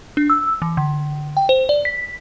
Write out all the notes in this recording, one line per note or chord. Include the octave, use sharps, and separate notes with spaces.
D4
E6
E3
D3
G5
C5
D5
B6